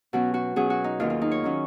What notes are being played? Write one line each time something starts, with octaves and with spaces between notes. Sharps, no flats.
B2 F#3 C#4 F#4
F#4
B2 F#3 C#4 G#4
F#4
D#4
D#2 D#3 F#3 C#4 F4
F4
D#4
C#5
D#3 F#3 C#4